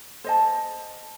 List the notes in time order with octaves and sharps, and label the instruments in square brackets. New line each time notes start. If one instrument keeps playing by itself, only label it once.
[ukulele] C5 D#5 A5